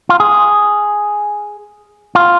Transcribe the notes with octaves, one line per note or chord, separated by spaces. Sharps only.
F4
G#4
F4